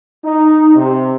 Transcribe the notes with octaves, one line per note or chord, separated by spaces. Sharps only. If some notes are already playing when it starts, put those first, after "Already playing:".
D#4
C3